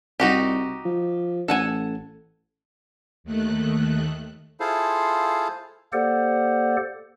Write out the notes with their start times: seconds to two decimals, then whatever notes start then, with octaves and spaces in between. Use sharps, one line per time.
0.20 C2 D#4 F#4 G4
0.85 F3
1.48 A1 A4 F#5 G#5
3.24 D#2 D#3 A3 F#6
4.60 E4 F4 G#4 A4 C5 F5
5.93 A#3 G4 A4 C5 D5 F#5